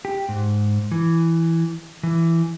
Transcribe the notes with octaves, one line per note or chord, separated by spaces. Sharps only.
G4
G#2
E3
E3